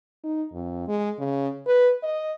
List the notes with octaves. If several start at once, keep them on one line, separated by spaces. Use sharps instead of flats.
D#4
F2
G#3
C#3
B4
D#5